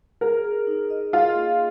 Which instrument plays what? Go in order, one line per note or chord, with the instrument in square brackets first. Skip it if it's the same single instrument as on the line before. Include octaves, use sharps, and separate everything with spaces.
[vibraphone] G#4 [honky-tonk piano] A#4
[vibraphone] G#4
D#4
D#5
[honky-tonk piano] F4 [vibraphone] G#4
[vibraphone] A#3